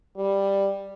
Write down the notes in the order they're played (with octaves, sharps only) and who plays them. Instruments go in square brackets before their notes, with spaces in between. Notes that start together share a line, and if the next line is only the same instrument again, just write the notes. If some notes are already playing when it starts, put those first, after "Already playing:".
[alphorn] G3